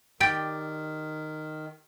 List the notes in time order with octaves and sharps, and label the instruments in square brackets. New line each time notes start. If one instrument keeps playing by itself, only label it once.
[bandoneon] D#3 [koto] G4 D5 G5